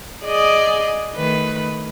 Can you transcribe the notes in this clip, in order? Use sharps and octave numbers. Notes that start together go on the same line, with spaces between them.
G#4 D5 D#5
D#3 A3 B4